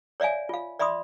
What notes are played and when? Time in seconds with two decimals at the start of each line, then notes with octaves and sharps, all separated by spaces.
0.20 C#5 D5 E5 F5 G#5
0.49 F4 F5
0.79 D5 E5 B5 C6 D#6